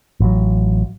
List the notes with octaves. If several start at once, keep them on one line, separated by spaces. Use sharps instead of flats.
A1 F#3